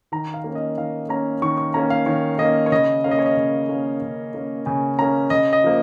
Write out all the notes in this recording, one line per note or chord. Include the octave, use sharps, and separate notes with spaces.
D#3 A#5
F5
A#3 C#4
D#5
D#3 F5
A#3 C#4 A#5
D#3 C#6
C#6
A#3 C#4 A#5
F5
D#3 C#5
A#3 C#4 D#5
C#5
C#3 D#5
A#3 C#4 F5
D#5
C#5
D#5
C#3
A#3 C#4
C#3
A#3 C#4
C#3 G#5
A#3 C#4 A#5
C#3 D#5
D#5
F3 A#3